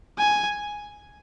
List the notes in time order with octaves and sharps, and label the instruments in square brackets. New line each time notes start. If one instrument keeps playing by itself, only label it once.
[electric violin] G#5